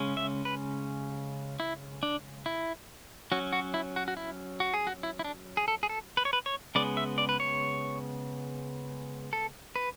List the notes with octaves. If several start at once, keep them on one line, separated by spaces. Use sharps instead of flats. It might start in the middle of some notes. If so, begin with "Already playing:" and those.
Already playing: C#3 G#3 C#4
E5
B4
E4
D4
E4
F#3 C#4 F#4
F#4
E4
F#4
F#4
E4
F#4
G#4
F#4
E4
E4
D4
G#4
A4
G#4
A4
B4
C#5
B4
C#5
C#3 G#3 B3 D5
E5
D5
B4
C#5
A4
B4